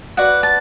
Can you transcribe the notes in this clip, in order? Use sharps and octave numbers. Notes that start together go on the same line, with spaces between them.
F#4 B4 D5 F#5
A5